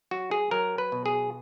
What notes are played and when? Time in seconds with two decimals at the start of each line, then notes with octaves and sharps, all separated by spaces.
0.11 F#3 F#4
0.31 G#4
0.51 F#3 A#4
0.78 B4
0.92 B2
1.06 G#4